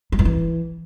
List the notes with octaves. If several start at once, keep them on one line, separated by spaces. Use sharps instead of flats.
G3
G2
E3